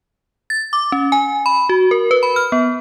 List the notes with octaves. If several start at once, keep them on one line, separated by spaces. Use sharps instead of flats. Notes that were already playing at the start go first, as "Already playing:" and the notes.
A6
D6
C#4
G#5
B5
F#4
A#4
B4
B5
F6
B3